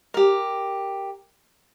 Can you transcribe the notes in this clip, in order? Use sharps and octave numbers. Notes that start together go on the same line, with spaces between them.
G4 A#4